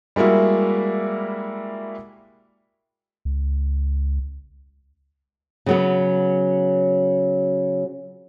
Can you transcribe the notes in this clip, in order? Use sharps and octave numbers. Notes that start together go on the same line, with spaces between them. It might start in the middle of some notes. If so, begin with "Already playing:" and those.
G3 G#3 A#3 E4 F#4
C#2
C#3 F#3 B3